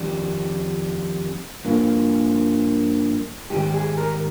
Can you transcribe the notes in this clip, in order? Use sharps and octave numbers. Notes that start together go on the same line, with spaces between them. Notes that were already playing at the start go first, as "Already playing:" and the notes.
Already playing: F2 D#3 G3
G2 F3 A#3
G#2 D#3 G3 G4
G#4
A#4